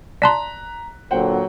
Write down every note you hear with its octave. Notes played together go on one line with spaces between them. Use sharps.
D5 A5 A#5 C6 F#6 B6
A#2 D3 F#3 C5 F#5 G5